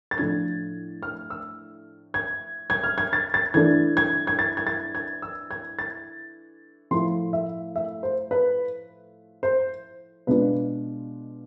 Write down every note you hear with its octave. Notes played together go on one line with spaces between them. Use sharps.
A6
A2 F3 A3 D4 F4 G#6
F6
E6
G#6
G#6
F6
G#6
A6
A6
E3 A3 D4 G#6
G#6
G#6
A6
G#6
A6
G#6
E6
G#6
A6
A2 F3 A3 E4 C6
E5
E5
C5
B4
C5
B2 G#3 D4 F4 B4